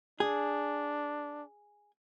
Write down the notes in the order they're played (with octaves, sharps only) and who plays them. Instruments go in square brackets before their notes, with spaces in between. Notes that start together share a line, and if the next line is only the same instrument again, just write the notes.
[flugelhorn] D4 [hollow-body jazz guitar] G#4